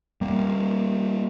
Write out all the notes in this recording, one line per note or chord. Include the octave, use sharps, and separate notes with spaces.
G3 A#3